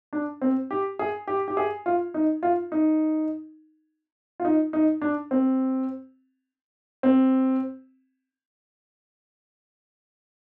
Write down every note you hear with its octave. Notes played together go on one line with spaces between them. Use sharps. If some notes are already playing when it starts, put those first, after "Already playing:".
D4
C4
G4
G#4
G4
G4
G#4
F4
D#4
F4
D#4
F4
D#4
D#4
D4
C4
C4